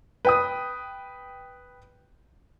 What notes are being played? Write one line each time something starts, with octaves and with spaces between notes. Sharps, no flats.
B4 G5 D#6